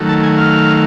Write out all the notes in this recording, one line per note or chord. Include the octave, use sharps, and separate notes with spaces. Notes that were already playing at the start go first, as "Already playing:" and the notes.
Already playing: D#3 F#3 A3
A5
G#5
F5